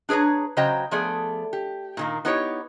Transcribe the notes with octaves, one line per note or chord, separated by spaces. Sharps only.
D4 G#4 B4 C#5 A#5
C#3 F#3 C5 D#5 G5 A#5
F3 A3 B3 G#4 D5
G4
A#2 D#3 A#3
B3 D#4 E4 G4 G#4 C#5